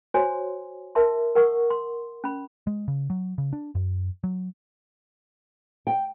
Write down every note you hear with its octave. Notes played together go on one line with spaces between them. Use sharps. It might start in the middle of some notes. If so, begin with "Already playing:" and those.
F#4 C5 C#5 G#5 C6
A#4 E5 A5 C6
A#4 F#5 C#6 D#6
C6
C#4 B5
G#3
C#3
F#3
C#3
D4
F#2
F#3
G5